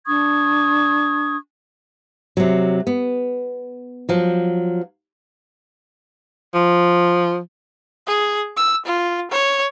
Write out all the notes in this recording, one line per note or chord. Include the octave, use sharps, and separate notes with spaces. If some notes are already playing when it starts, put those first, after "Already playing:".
D4 C#6 D#6 G#6
C3 F#3
B3
F3 F#3
F3
G#4
E6
F4
C#5